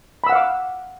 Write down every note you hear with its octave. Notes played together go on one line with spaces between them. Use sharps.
F5 F#5 B5 D6 E6